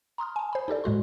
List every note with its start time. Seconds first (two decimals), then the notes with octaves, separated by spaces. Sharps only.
0.18 A#5 C6 D#6 F6
0.36 G#5 A5
0.53 C5 B5
0.68 D#4 G4 A4 D5
0.84 A2 G#3 F#4 C6